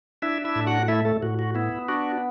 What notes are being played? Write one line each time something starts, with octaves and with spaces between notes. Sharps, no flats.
D4 E4 E5
E4 E5
A2
F#4 F#5
A3 E4 E5
A3 A4
A2 F#4
F#4
B3 E4
D4 F#4